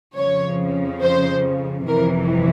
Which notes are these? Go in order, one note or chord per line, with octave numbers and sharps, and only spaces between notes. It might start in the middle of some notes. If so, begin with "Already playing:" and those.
F2 C#3 F3 C#5
C5
G1 F2 C3 E3 A#4